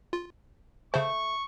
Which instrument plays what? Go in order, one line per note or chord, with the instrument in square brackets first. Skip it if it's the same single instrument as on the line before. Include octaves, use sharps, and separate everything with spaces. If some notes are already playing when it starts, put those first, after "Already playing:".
[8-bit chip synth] F4
[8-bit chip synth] C#3 C5 [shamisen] A3 [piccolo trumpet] C#6